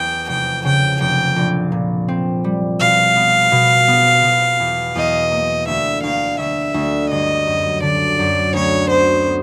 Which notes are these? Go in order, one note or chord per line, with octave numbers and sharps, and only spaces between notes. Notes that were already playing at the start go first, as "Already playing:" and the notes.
Already playing: E2 G5
F1 G5
C#3 G5
F1 G5
A#1
A#2
C4
G3
B2 F5
B3
B2
B3
B2
E2
E2 D#5
A#3
D2 E5
D2 F5
D2 E5
D2
G1 D#5
F#2
D3 D5
F#2
D2 C#5
B3 C5
B3